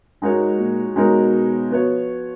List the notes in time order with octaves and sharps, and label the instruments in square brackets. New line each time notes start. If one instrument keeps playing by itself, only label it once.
[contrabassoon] G#2 [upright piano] G#3 D#4 F#4 A#4 C#5
[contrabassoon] A#2
[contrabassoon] B2 [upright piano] G#3 D#4 F#4 A#4 C#5
[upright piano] F3 B3 F#4 C#5